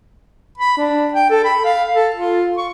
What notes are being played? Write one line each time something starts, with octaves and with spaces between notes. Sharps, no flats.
B5
D4
G5
A4
B5
F5
A4
F4
C#6